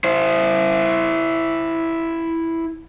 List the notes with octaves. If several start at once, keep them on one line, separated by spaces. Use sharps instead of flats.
E4 C5